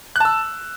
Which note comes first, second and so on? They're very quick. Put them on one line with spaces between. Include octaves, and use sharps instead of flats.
F#6 A5 E6